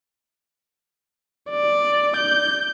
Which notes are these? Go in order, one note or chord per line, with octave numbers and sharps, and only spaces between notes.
D5
G6